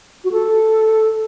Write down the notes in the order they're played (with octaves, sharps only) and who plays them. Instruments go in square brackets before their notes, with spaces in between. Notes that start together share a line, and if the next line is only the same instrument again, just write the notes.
[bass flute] F#4
A4